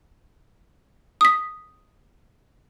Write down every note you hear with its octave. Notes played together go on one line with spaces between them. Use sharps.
D#6 B6